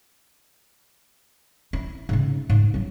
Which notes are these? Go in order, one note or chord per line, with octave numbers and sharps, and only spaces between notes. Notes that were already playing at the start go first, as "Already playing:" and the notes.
E4
G#2 C#3
G#2
F#3 B3